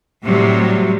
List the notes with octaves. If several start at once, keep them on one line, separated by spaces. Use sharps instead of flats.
A2 C3 F#3 G3